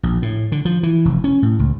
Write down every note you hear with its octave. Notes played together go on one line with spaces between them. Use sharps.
A#1
A2
D3
F3
E3
F1
C#4
A2
C#2